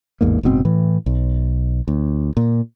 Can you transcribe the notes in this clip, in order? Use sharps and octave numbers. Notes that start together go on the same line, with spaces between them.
A1 E2 G#2 A#3
F#1 G#2 B2 C4
A2 E3
B1
D2
A#2